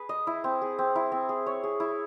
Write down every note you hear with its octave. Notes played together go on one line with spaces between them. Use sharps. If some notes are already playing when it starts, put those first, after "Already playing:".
Already playing: G#4 B4
D#5
E4
C4
G#4
C4
E4
C4
G#4
C#5
G#4
E4